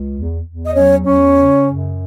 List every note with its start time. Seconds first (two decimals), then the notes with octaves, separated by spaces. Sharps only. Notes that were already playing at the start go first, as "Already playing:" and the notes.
Already playing: C#2
0.15 E2
0.45 E2
0.66 D#5
0.75 F#3 C#4 C#5
1.05 E2 C#4 C#5
1.36 C#3
1.65 F#2